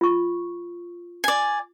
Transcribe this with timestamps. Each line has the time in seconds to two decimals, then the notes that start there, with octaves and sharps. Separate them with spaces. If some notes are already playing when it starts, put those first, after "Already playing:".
0.01 F4 C#6
1.24 D5 G#5